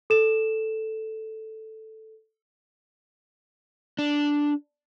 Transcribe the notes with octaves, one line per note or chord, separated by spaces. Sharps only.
A4 E7
D4